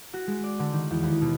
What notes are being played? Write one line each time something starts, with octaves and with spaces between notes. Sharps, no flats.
F#4
G#3
D5
D3
D#3
E2
D#2
B2